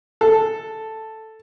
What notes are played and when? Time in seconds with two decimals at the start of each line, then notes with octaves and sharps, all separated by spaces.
0.21 A4